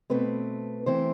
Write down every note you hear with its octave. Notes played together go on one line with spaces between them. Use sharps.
B2 A3 C4 B4
E3 A3 C4 C5